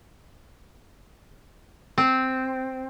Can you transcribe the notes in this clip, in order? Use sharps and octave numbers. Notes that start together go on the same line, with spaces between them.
C4